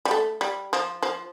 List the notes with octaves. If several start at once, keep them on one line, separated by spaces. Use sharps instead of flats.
G3
A3
G3
F3
F3